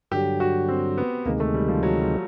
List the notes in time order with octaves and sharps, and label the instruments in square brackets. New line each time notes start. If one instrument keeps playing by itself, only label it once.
[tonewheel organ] G2 D3 F#3 [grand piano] G4
[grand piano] F#4
C4
B3
[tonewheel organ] D2 C3 D#3 G#3 [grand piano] A#3
[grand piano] A3
G3
F3
F#3
G3